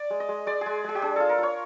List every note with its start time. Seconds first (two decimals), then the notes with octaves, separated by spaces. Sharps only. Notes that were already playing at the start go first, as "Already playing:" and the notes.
Already playing: D5
0.10 G#3
0.20 D#5
0.29 G#3
0.47 G#3 D5
0.61 G#3 G#4
0.84 G#3 G#4
0.95 G4
1.02 D4 G#4
1.16 F4 A4
1.29 A#4
1.38 F4 C#5